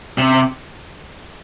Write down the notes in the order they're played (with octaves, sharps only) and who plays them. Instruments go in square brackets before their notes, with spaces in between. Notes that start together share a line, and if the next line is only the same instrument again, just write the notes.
[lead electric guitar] C3